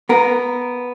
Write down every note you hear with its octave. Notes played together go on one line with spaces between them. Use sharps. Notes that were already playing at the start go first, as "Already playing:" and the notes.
B3 A#4